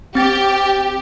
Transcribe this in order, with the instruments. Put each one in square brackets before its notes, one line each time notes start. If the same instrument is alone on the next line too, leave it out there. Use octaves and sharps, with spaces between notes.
[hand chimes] C4 A6 [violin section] G4